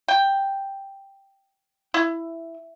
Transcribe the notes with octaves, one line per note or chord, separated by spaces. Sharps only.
G5
E4